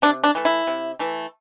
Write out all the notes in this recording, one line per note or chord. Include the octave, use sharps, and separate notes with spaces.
C3 D4
D4
E3 A3
E4
C3
E3 A3